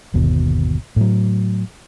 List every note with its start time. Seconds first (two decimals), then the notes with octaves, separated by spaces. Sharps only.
0.14 G1 D#2 B2
0.96 A2 F#3